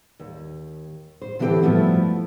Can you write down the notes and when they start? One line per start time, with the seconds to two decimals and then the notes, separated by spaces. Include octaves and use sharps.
0.20 D#2
1.22 C5
1.39 D3 E3 C4 E4 G4 A4
1.62 G2 F3 A3 B3 E4 F#4